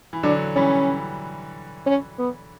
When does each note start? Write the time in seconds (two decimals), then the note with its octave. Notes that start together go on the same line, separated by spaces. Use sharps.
0.13 E3
0.23 D3 F#3 D4
0.56 E3 G3 C#4
1.87 C#4
2.19 B3